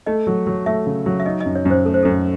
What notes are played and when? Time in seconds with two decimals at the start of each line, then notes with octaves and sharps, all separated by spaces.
0.06 A3 D#5
0.27 F#3
0.47 F#3
0.66 A3 E5
0.86 C#3
1.06 F#3
1.20 E5
1.26 D#4 D#5
1.40 D#5
1.46 F#2
1.55 C#5
1.65 F#2 C5
1.85 A3 A4
1.94 C5
2.02 F#2 A4